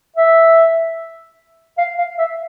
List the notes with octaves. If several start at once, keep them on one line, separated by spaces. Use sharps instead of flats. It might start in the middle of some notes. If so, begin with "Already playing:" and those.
E5
F5
F5
E5